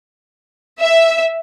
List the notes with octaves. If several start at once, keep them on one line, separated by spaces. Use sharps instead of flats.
E5